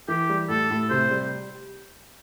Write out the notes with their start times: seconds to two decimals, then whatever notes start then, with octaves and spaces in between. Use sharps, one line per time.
0.08 E3 G4
0.29 G3
0.49 A2 A4
0.70 A2
0.90 C3 C5
1.11 G3